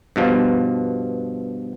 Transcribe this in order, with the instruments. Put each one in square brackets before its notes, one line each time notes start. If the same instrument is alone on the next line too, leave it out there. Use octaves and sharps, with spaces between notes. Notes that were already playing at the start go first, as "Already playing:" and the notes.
[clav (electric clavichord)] G2 B2 F3